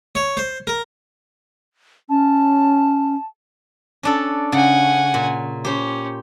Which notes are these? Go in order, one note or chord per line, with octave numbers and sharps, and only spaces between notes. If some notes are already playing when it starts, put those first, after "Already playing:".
C#5
C5
A#4
C#4 A5
C#4 D4 A4
C#3 F#5 G#5
A#2
C#4 G4 C5